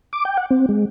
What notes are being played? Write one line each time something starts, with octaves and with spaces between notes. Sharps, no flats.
D6
G5
F#5
C4
G#3